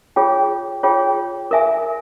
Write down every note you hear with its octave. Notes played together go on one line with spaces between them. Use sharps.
F4 G#4 C#5 G5
F4 G#4 C#5 G5
A#4 E5 G#5